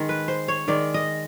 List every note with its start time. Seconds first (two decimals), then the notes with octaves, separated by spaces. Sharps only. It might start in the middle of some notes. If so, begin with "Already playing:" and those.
Already playing: D#3 G#3
0.09 B4
0.28 C5
0.48 C#5
0.68 D#3 G#3 D5
0.94 D#5